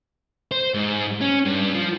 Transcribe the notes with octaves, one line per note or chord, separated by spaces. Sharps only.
C5
G#2
C#4
G2
F3